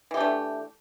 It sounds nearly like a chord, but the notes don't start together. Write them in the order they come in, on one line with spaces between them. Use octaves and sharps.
E3 G4 D4 A3